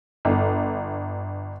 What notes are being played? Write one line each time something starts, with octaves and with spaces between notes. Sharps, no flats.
G1